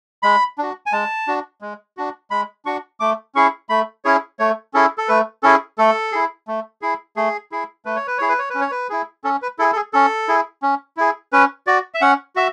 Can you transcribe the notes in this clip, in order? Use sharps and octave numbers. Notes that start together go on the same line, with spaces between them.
G#3 B5
D4 F#4
G#5
G#3 A5
D4 F#4
G#3
D4 F#4
G#3 B5
D4 F#4 C#6
A3 D6
C#4 E4 G#4 C#6
A3 B5
C#4 E4 G#4 C#5
A3 C#5
C#4 E4 G#4 A4
A4
A3 B4
C#4 E4 G#4 A4
A3 A4
E4 G#4
A3
E4 G#4
A3 G#4
E4 G#4
A3 B4
C#5
B4
E4 G#4 C#5
B4
C#5
B4
C#4
C#5
B4
E4 G#4
C#4 A4
B4
E4 G#4 A4
A4
G#4
C#4 A4
E4 G#4
C#4
E4 G#4
C#4 B4
F#4 D5
E5
C#4 F#5
F#4 E5